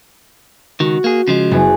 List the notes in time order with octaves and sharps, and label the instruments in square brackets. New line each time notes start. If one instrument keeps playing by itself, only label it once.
[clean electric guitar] C#2 D#3 [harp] F#4
[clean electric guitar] A#3 G#4
C#3 F3 G#3
[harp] F#1 B3 G#4